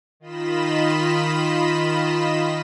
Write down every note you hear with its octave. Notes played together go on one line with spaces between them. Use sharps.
D#3 F4 D#5 B5 E7